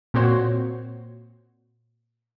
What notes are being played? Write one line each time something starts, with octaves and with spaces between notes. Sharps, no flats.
A#2 C4 F#4 C5 C#5